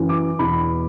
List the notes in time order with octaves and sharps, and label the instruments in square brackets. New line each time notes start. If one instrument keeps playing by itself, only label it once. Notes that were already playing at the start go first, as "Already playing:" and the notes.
Already playing: [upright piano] F#2 E3
D6
E2 B2 B5